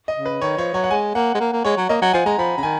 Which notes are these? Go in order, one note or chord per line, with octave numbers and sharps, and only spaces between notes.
D#5
C#3
B4
D#3 C#5
F3 C#5
F#3 C#5
F#5
G#3 G#5
A#3 F#5
G#3
A#3
A#3
G#3 C#5
F#3
A#3 D#5
F#3 F#5
F3 G#5
G#3 A#5
F3 B5
C#3 A#5
D#3 G#5